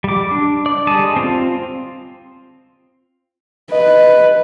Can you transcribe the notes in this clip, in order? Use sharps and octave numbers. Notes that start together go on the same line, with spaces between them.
G3 D6
D4
D5
D3 G3 G#3 A5 D#6
C4 F4
B4 D#5